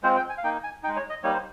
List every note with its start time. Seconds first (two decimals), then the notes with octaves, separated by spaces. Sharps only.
0.03 G#3 C4 F4 C5
0.16 G5
0.30 G#5
0.38 F5
0.43 A#3 D#4 G5
0.64 G#5
0.83 D#4 G5
0.88 G#3
0.96 C#5
1.10 D#5
1.23 G3 A#3 D#4 C#5
1.33 C5